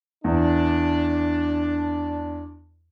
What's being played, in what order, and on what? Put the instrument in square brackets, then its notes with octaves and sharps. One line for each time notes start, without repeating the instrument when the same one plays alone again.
[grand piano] E2 [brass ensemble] D4